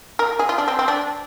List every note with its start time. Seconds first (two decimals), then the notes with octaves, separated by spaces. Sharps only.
0.19 A#4
0.39 G#4
0.49 F4
0.58 D4
0.68 C4
0.79 C4
0.88 D4